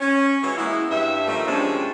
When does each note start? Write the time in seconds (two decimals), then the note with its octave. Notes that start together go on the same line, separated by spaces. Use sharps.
0.01 C#4
0.43 E3 G#3 C#4 F#4 C#5
0.57 G#3 A#3 B3 E4
0.91 G2 E5
1.27 D#3 F3 G3 A3 A#3
1.46 C3 F3 F#3 G#3 C#4 D4